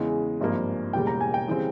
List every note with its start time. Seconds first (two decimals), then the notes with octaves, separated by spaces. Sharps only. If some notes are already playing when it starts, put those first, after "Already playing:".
Already playing: E2 C#3 E3 G#3
0.40 G#1 G2 F3 A#3
0.93 E1 E2 C#3 G3 A#3 G5
1.07 A#5
1.21 G#5
1.34 G5
1.48 C#3 E3 G3 C4